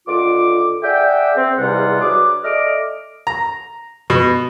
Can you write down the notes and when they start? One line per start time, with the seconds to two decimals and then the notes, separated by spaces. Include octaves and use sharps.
0.08 C#2 D3 F4 D6
0.83 G#4 D5 E5 F#5 G5
1.37 C4
1.58 E2 G#2 C3 G3 F4 F#5
2.01 F#3 D4 G#4 B4 D6
2.44 A3 D5 D#5 D6 F6
3.27 A#5
4.10 B2